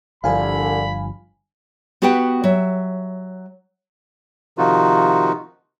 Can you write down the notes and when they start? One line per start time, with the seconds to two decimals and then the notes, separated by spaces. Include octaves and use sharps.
0.24 G1 C2 G2 D3 F3 F5 G#5 B5
2.02 B3 F#4 G4 B4 F#5 G5
2.44 F#3 E5
4.58 C3 D#3 F3 D#4 F4 F#4